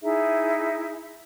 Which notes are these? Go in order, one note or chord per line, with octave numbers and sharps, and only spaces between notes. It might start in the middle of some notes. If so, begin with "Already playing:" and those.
D#4 E4 G#4 E5